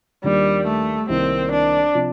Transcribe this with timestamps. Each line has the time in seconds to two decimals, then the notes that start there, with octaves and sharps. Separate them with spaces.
0.24 D#2 D#3 G3 A#3 D4 F4
0.67 A3
1.09 C2 C3 D#3 A#3 C4
1.52 D4
1.95 C3 F3